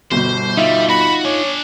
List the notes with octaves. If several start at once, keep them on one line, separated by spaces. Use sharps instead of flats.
G1 B2 C5
G3 D#4 F4 E5
F#4 B5
D4 C#5 G#5